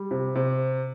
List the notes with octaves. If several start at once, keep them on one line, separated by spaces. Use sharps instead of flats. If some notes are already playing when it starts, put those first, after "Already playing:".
Already playing: G3
C3
C3